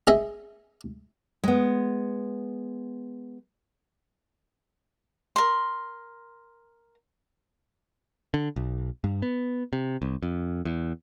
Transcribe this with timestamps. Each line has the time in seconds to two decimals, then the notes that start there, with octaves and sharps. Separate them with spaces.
0.07 G#4 D#5 E5
1.44 G#3 B3
5.36 A#4 C6
8.34 D3
8.56 B1
9.04 G2
9.22 B3
9.73 C3
10.02 C2
10.22 F2
10.65 E2